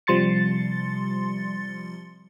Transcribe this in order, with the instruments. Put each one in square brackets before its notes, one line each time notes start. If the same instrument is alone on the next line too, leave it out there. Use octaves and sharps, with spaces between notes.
[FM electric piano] C3 F3 G3 C6 A6 C#7